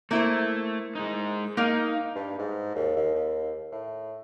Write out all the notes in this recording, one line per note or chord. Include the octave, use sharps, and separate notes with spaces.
A3 A#3 E4 C5
G#3 D#4
A#3 D#4 A#4 F5
G2
G#2
D#2
D#2
D#2
A2